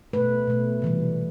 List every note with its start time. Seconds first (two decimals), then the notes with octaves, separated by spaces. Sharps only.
0.13 B2 A3 B4
0.47 B2 A3
0.82 C3 E3 G3